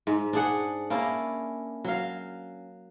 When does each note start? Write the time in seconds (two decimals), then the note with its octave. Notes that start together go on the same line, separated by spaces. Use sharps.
0.07 G#2
0.33 D4 G#4 F#5
0.90 A#3 C#4 D4 E4
1.84 F#3 F5